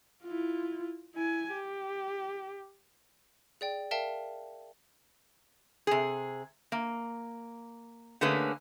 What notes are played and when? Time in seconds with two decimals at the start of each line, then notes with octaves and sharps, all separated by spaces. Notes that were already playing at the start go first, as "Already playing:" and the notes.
0.24 E4 F4
1.15 E4 G#5
1.54 G4
3.61 G#4 D5 G5
3.91 A#4 D5 E5 F5 G5 A5
5.87 C3 G#4
6.72 A#3
8.21 D3 A3 A#3 C#4 G#4 B4